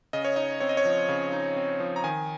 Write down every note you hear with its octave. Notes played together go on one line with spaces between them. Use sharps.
C#3 D#5
C#5
D#4 D#5
C4 C#5
D#5
C#5
F3
C#3
D#4
C4
F3
A#5
D#3 G#5